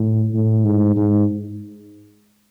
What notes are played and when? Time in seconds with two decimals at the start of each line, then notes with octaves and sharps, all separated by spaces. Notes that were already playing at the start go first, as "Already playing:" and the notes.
Already playing: A2
0.34 A2
0.65 G#2
0.96 G#2